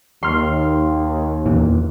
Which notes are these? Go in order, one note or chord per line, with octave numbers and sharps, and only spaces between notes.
D#2 C6 F6 C7
E2 A#2 E3